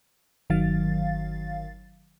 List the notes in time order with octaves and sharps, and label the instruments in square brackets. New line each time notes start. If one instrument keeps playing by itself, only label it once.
[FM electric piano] G1 D#3 F#3 F5 A6